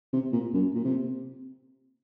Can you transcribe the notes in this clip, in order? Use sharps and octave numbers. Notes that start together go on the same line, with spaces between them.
C3
A#2
F#2
A#2
C3